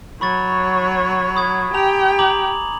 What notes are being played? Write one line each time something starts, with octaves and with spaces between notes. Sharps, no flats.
F#3 C#5 B5 C#6 A6
B5 D#6 G#6
G4 G5 G#5 A#5 F7
A#5 D6 F#7